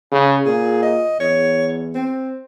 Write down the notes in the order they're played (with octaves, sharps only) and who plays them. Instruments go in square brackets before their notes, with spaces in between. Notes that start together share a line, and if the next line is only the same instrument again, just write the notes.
[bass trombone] C#3
[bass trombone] A#2 [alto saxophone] G#4
[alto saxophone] D#5
[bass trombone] E2 [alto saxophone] C#5
[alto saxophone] C4